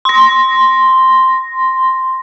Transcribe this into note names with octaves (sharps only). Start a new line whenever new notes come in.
C6 A#6